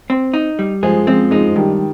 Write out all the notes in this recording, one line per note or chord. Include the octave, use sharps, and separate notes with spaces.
C4
D#4
G3
F3 G#3 G#4
F3 G#3 C4
F3 G#3 D#4
G2 D#3 G3